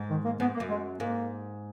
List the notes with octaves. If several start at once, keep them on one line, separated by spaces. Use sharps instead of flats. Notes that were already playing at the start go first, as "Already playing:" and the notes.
Already playing: G#2
D#3
A#3
G#2 B3
A#3
F#2
G#3
G#2 A#3